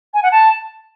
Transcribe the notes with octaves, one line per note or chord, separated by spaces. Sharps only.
G#5
F#5
A5